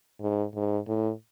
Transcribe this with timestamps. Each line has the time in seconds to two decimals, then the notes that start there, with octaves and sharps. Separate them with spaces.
0.21 G#2
0.55 G#2
0.88 A2